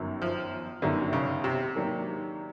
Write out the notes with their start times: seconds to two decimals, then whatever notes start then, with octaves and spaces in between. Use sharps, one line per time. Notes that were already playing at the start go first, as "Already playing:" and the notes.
Already playing: G1 F#2 D#3 F#3
0.22 F3
0.82 G1 F#2 D3 D#3 F#3
1.13 C#3
1.44 C3
1.75 G#2 D#3 F#3 A#3 D4